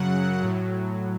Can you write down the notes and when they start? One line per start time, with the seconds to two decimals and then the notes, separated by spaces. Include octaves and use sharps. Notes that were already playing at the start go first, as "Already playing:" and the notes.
Already playing: F#2 C#3 F#3 F#5
0.40 A2 F#3